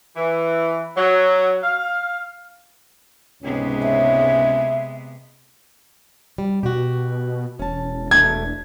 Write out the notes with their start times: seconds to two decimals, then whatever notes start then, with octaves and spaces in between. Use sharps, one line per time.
0.16 E3
0.97 F#3
1.63 F5
3.43 C#2 G#2 C3 G#3 B3 C#4
3.82 E5
6.38 G3
6.63 B2 F#4 G4
7.59 E1 C#4 A5
8.11 B2 A3 D4 G#6